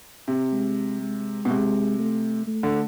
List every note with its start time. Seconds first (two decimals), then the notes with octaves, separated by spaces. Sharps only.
0.28 C3
0.52 G#3
1.01 G#3
1.45 B2
1.50 C3 G#3
1.99 A3
2.47 A3
2.63 D3